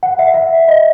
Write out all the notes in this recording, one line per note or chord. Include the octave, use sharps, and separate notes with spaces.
F#5
E5
E5
D#5